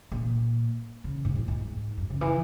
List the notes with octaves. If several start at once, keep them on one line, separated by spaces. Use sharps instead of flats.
A#2
C#3
G#2
A#2
G#2
F#2
C#3
E3